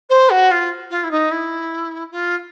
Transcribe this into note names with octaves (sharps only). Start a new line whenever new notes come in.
C5
F#4
F4
F4
E4
D#4
E4
F4